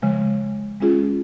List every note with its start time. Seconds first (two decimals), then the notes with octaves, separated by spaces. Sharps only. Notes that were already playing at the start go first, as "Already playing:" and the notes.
0.02 C#3 F3 G#3
0.80 G#3 C#4 F4 G#4